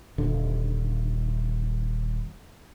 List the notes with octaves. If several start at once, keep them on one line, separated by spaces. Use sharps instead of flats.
D#1 D3